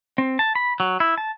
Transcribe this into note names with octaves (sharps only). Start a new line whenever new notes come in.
C4
A5
B5
F#3
E4
A5